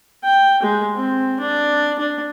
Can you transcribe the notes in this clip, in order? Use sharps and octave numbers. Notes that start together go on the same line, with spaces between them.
G5
G#3
C4
D4
D4